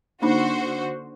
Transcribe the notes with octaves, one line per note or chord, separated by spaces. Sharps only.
D3 A#3 D4 D#4 F#4 C5